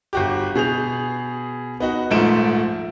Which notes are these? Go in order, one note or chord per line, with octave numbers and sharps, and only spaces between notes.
G1 F#4 G4
B2 G#4 G6 F7
B3 D#4 F#4
D#1 G#2 F3 A3 D7 E7